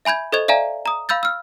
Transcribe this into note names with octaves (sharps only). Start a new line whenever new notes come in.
E5 G#5 B5 G6 G#6
A4 C5 D#5 C#6 G#6 F7
D5 E5 F5 G#5 A#5
A#5 D#6
F5 B5 E6 G6 A6
E6 F6